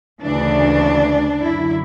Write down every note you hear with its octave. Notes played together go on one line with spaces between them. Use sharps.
D2 C#3 E3 D4
F#2 D3 E4